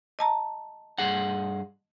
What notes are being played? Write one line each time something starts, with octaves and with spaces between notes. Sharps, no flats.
D#5 A5 A#5
G2 G#4 F#5